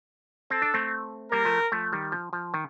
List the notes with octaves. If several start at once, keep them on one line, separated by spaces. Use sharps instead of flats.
C4 A4
D4
A3 C4
G3 A#3 A#4
F3 A3
F3 A3
D#3 G3
F3
F3
D#3